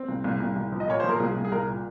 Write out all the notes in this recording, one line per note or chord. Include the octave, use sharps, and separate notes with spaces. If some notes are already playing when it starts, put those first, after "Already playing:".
Already playing: C4
C2
C2
C2
C2
F3
D#5
A#2 C#5
F3 C5
A#4
C2 G#4
C2
G#4
C2 A#4
A#2